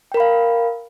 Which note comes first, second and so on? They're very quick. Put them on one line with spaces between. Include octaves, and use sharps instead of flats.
G5 A#4 B5 F5